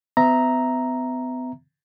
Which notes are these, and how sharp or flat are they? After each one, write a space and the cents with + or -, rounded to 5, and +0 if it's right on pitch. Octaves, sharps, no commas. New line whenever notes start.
B3 +40 E5 +0 A#5 +0